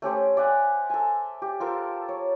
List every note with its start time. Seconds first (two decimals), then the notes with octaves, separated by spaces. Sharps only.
0.02 A3 C#4 G4 C5
0.37 D5 E5 F#5 G#5
0.90 A4 G#5
1.42 G4
1.60 F4 A4 A#4 C5
2.09 C#5